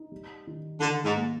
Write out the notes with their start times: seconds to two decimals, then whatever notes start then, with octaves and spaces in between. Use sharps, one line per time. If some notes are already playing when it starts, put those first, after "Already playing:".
Already playing: D#4
0.12 G3
0.47 D#3
0.81 D3 D#3
1.04 G#2
1.16 A#3